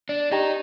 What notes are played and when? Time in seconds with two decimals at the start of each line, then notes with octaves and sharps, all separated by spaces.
0.09 D4
0.31 D#4 G4 D5 G5 A#5